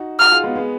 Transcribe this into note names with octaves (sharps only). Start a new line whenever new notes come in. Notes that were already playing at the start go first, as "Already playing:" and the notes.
Already playing: D#4 F#4
D#4 F#4 F6
F4 G#4
G#3 B3
G#3 B3